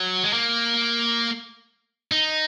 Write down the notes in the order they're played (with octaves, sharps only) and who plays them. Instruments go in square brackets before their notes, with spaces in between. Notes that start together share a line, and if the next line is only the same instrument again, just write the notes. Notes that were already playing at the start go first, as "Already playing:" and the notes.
Already playing: [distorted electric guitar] F#3
G#3
A#3
D#4